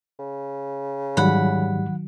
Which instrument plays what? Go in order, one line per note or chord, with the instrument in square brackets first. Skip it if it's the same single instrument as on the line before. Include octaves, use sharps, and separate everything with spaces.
[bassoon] C#3
[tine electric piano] G#2 G3 [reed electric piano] D#3 F#3 [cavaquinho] F#5 B5